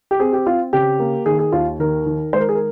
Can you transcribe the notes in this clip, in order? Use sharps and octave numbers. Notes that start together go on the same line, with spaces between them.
G4
C4 G#4
G4
C4 F4
C#3 G4
A#3
D#3 G#4
G#4
D#2 F4
D#3 A#4
D#3
G#3 C5
A#4
G#4
A#4